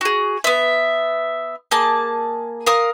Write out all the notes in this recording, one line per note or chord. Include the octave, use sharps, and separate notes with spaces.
F#4 G#4
B3 E5
A#3 G#4 A5
A#4 F5 D#6